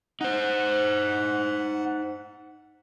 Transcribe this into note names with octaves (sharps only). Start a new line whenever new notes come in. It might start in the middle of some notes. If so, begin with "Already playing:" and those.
D#4 C5 F#5